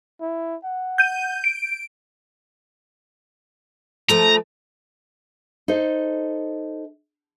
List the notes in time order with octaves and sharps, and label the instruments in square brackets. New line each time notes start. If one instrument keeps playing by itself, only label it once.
[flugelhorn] E4
F#5
[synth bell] G6 D#7
D7
[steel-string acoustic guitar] F3 A3 [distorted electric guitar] A#5
[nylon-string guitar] D#4 A4 C5